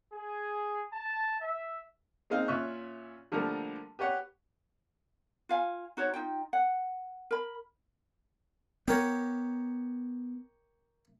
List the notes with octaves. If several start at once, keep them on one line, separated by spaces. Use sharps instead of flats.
G#4
A5
E5
G#3 A#3 C4 D#4 F5
A#2 C#4 F4 E5 C#6 F#6
D3 F3 G3 A3 A#3 A#4
G4 B4 C#5 F#5
F4 F5 G#5
D#4 F#4 C5 C#5
D#4 F4 G5
F#5
A#4 B5
B3 G4 A#4 C#5